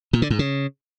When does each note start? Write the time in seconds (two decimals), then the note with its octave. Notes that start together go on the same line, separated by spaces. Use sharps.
0.13 A#2
0.22 D3
0.30 G#2
0.39 C#3